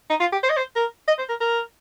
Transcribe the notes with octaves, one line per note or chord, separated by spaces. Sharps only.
D#4
F4
G4
C5
D#5
C5
A#4
D#5
C5
A#4
A#4